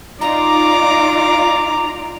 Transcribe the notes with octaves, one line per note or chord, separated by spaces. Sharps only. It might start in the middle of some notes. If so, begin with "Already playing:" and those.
D#4 F4 D5 A#5 D6